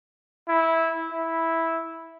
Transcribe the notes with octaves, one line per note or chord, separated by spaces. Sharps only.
E4
E4